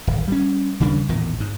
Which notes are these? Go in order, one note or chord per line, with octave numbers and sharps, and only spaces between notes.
D1 G#1
G3 C#4
D#2 C#3 G3 D4
A1 E2 A#2 D#3
G#2